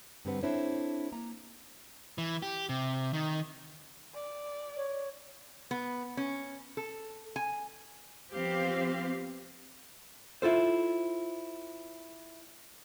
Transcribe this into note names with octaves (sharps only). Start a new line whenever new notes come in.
G2 D3 G3 C4 B4 F#5
C4 D4 E4 A4 C5 C#5
A#3 A#5
E3
G4
C3
D#3
D5
C#5
B3
C#4
A4
G#5
F3 B3 C4 G4 F5
E4 F4 A4 C5